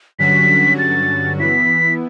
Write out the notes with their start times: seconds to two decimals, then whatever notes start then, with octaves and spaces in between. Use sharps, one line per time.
0.18 G2 D3 F#3 C#4 F#4 B6
0.78 A6
1.39 E3 B3 E4 B6